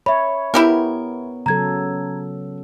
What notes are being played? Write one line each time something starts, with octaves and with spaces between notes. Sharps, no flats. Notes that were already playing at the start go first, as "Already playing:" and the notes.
C#5 E5 B5
B3 E4 G4 A#4
C#3 F#3 A4 A#5 G#6